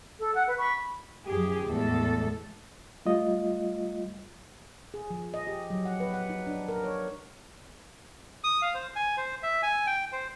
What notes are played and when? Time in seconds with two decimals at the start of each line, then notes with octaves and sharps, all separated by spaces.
0.18 A4
0.34 F#5
0.46 B4
0.57 B5 C#6
1.25 F#2 F3 G4 G#4
1.67 E2 A2 G#3 A4
3.06 G3 A3 F4 D#5
4.94 G#4
5.11 F3
5.34 D#5
5.47 G4
5.70 F#3
5.85 F#5
6.00 B4
6.14 F#5
6.29 D#4
6.47 D4
6.68 A#4
6.84 C#5
8.44 D#6
8.62 F5
8.74 C5
8.96 G#5
9.17 C5
9.43 E5
9.63 G#5
9.87 G5
10.13 C5